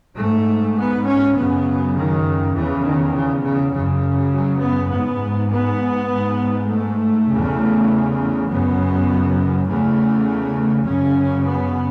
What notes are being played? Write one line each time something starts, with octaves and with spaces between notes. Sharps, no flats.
G#2 A3
B3
C#4
F#2 C#3 B3
D#3
E2 C#3 E3
D#3
C#3
C#3
F#2 C#3
F#3
B3
G#2 B3
B3
G#2
A3
E2 C#3
F#2 C#3 B3
E2 C#3 A3
F#2 C#3 C#4
B3